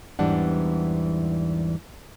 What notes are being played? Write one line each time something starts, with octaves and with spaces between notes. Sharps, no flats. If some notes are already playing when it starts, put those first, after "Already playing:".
E2 G#2 E3 G3 D4 F#5